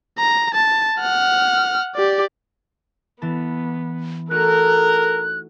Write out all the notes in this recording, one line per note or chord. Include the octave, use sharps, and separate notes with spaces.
A#5
A5
F#5 F6
G4 D5
E3 B3 A5
A3 D#4 F#4 A4 A#4 F#6